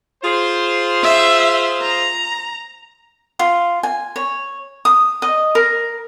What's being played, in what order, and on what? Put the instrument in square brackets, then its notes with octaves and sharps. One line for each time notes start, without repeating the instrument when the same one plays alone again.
[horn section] F4 G#4 C5
[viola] E5
A#5
[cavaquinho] F4
G#5
C#5
D#6
D#5
A#4